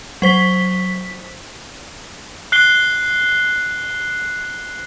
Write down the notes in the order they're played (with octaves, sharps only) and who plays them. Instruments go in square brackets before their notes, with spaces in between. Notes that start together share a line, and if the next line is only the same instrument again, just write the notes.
[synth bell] F#3 C5 B6
[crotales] F#6 C7 G7